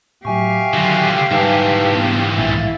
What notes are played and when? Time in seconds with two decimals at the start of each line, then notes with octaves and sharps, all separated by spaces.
0.25 A2 F#3 G4 E5 F5 G#5 C#6
0.74 D3 D#3 F#3 F4 A#6
1.31 G#2 E3 G3 D#4 B4 A5
1.95 B3 D4
2.37 B1 G2 A#2 D#3 E4 F5 A6